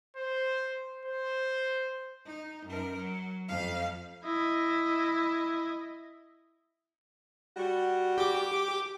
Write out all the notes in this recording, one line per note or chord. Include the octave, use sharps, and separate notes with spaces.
C5
C5
D#4
F#2 A#4
F#3
F2 F5
E4 D#5
G3 F#4
G4 D6